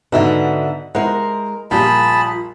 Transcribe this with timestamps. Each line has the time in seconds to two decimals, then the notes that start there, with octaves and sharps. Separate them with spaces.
0.12 G#2 B2 D3 E5 F#5
0.95 G#3 E4 A#4 C5 F#5
1.71 A#1 G3 F4 G#4 A5 B5